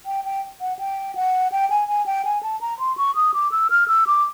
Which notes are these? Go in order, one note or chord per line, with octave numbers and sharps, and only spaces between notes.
G5
G5
F#5
G5
F#5
G5
G#5
G#5
G5
G#5
A5
A#5
C6
C#6
D#6
D6
E6
F6
E6
D6